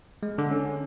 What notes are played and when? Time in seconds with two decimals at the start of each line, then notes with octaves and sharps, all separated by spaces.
0.23 G#3
0.38 D3
0.51 C#4